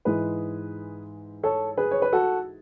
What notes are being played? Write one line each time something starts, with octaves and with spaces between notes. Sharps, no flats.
G#2 E3 G#3 G#4 B4
A4 C#5
G#4 B4
C#5
B4
F#4 A4